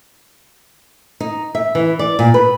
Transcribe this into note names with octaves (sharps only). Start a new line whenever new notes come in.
D#4
E5
E3
D5
A#2
B4